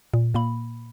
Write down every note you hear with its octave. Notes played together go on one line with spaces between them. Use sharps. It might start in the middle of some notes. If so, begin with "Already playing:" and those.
A#2
A#2 A#3 B5